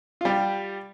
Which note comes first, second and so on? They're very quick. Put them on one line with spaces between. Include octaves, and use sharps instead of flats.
F4 G3 G4